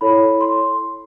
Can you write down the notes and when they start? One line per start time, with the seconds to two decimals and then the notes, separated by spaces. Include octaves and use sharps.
0.01 E4 A4 C#5 B5
0.41 C6